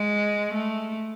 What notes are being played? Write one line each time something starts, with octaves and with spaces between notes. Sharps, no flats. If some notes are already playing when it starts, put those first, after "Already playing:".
Already playing: G#3
A3